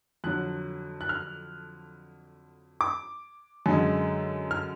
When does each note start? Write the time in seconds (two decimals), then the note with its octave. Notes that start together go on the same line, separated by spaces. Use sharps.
0.24 F2 D3 F#3 F#6
1.01 F#6
1.09 F6
2.81 D6
3.66 F#2 D3 G#3
4.51 F6